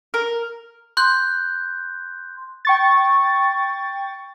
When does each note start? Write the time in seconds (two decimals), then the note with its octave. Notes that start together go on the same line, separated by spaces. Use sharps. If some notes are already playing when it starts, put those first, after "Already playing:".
0.14 A#4
0.97 C6 F#6 G6
2.65 G5 C#6 A6